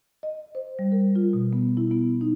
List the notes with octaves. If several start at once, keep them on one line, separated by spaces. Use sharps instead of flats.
D#5
C5
G3
A#4
F4
B2
B3
E4
B3
D#4